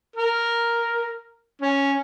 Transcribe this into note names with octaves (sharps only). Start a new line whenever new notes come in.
A#4
C#4